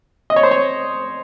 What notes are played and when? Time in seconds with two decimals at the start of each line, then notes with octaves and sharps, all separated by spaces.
0.30 D#5
0.36 C#5
0.43 C5
0.51 C#5